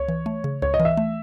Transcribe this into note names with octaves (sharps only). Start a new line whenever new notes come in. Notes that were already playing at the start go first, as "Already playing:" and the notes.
Already playing: C#2 C#5
E3
A3
C#3
C#2 C#5
D#5
E3
E5
A3